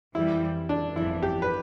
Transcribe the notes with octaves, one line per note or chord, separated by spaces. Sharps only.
F2 E3 G3 E4
D4
G1 F2 E3 E4
G4
B4